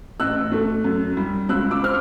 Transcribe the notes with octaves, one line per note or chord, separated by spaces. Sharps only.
A1 E6 F#6
A3
F#2
G3
C#2 E6 F#6
D6 E6
C4 F6